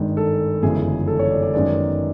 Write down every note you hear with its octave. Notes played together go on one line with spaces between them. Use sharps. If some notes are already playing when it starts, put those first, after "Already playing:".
Already playing: G#1 G2 D#3 G#3
A4
G1 F#2 C#3 E3 G#3 G#4
A4
C#5
D5
D5
F#2 D#3 G#3 B3 D5